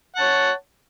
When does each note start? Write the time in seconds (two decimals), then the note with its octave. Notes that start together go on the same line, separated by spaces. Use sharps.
0.16 F#5
0.18 A5
0.21 C#5